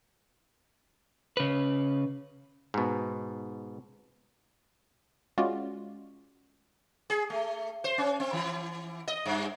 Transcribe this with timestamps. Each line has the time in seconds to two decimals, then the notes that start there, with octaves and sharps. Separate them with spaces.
1.37 C#3 B4
2.74 G#2 B2
5.38 G#3 C#4 F4 F#4 D5
7.10 G#4
7.30 A3
7.84 C5
7.98 C#4
8.20 C4
8.33 E3
9.08 D#5
9.26 G2